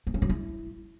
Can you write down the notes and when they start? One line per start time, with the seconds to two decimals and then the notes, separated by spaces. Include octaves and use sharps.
0.07 B3
0.14 C#4
0.22 F#3
0.29 E4